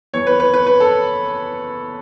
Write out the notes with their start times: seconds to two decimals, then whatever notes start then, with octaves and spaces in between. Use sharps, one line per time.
0.13 E2 E3 C#5
0.27 B4
0.40 B4
0.54 B4
0.66 B4
0.80 A4